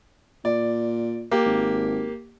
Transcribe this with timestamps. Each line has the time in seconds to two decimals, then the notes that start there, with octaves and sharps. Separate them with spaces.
0.45 A#2 D5
1.31 A#3 G4
1.46 G#1